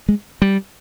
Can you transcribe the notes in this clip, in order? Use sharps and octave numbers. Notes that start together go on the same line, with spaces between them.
G#3
G3